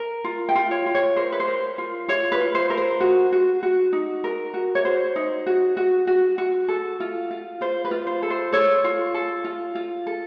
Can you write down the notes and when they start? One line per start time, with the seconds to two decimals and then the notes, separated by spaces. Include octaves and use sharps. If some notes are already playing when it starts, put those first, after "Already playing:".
Already playing: A#4
0.24 F4
0.49 G5
0.55 F4
0.71 C#5
0.86 F4
0.95 C#5
1.16 A#4 C5
1.32 B4
1.40 C5
1.48 A#4
1.78 F4
2.08 F4 C#5
2.32 B4
2.40 F4
2.55 C5
2.70 A#4
2.77 C5
3.00 F#4
3.32 F#4
3.63 F#4
3.93 D#4
4.24 A#4
4.54 F#4
4.75 C#5
4.85 F#4 C5
5.16 D#4
5.46 F#4
5.77 F#4
6.07 F#4
6.38 F#4
6.68 A4
7.00 F4
7.31 F4
7.61 F4 C5
7.85 B4
7.91 F4
8.07 C5
8.22 A4
8.30 C5
8.52 A4 C#5
8.84 F4
9.14 A4
9.44 F4
9.75 F4
10.07 A4